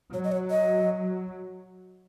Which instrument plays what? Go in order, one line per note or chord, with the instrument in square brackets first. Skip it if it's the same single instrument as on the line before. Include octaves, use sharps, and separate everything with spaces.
[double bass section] F#3 [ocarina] C#5
[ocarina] D#5
C#5
D#5